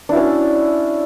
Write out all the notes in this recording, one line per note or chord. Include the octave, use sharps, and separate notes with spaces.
C#4 D4 E4 F#4